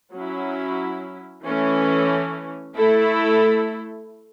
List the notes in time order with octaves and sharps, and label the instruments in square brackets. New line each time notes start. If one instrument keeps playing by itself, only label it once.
[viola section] F#3 C#4 E4
E3 A3 C#4
A3 E4 A4